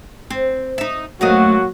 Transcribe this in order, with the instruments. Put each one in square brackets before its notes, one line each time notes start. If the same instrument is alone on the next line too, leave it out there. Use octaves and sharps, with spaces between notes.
[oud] C4
D#4 E5
[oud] F#2 A3 D#5 [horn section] F#3 A#3 F#4